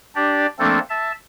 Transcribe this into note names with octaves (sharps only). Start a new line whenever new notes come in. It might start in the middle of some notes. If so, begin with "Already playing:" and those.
D4 G4 D5
F3 A3 A#3 C4 D4 A4
E5 A5